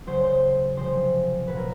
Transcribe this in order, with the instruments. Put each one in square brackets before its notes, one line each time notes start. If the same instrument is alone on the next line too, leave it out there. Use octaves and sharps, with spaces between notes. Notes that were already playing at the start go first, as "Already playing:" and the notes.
[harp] C#3 F#3 C5
C5
C3 F3 G#3 C5
A#2 F#3 B4
A#4